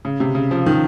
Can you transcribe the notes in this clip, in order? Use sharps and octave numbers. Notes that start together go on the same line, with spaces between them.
C#3
C3
C#3
F3
D#3